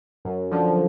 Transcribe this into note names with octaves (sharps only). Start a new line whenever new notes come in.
F#2
D3 F3